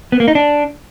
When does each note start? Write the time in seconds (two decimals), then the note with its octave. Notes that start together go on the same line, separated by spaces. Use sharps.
0.12 B3
0.20 A#3
0.28 D#4
0.35 D4